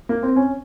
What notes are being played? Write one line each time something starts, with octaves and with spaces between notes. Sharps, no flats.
A#3
C4
C#4